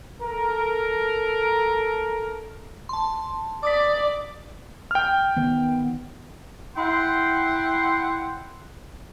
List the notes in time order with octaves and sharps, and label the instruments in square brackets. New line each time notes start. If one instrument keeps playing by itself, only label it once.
[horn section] A4 A#4
[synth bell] A5 C6
[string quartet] D5 [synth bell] D6 D#6 B6
[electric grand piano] G5 F6
[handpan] D#3 B3
[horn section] E4 F#5 G5 C6